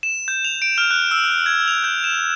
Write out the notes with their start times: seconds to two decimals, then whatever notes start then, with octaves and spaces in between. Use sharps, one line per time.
0.03 E7
0.28 G6
0.44 F7
0.62 D7
0.78 F6
0.91 F#6
1.11 E6
1.46 G#6
1.68 F7
1.84 G6
2.04 E7